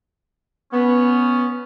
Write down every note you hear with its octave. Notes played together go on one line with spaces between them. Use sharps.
B3 C#4